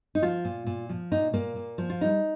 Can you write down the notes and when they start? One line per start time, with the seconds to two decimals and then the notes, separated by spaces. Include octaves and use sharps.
0.15 D#4
0.22 F3 F4
0.45 A#2
0.66 A#2
0.89 F3
1.11 A#2 D#4
1.34 A#2 A#3
1.56 A#2
1.78 F3
1.90 F4
2.01 G3 D#4